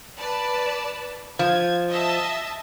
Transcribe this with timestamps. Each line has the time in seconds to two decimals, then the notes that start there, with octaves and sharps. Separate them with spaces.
0.18 B4 D5 A5
1.39 F3 G#6
1.88 D#5 E5 A5